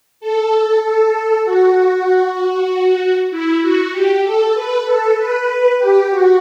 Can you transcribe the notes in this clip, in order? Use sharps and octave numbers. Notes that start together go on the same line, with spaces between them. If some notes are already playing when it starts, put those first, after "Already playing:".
A4
A4
F#4
E4
F#4
G4
A4
B4
A4
B4
G4
F#4